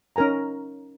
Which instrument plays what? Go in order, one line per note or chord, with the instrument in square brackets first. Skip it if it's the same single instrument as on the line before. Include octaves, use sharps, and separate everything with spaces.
[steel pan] C#4 D#4 A#4 G#5 A#5